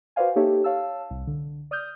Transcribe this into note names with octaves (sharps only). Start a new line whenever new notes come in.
F#4 B4 C5 D5 F5 G#5
A#3 D#4 G4 A4 C#5 E5
C#5 F5 A5 E6
C2
D3
D5 D#6 F6 G6